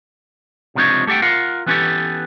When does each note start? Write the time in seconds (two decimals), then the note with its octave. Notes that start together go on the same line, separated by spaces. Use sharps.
0.75 C#2 C3 F3 D4 D#4 C#5
1.07 A3 G4 A4 F#5 G5
1.22 F4 A#4 F5 F#5
1.66 E3 B3 C#4 F4 G4 A4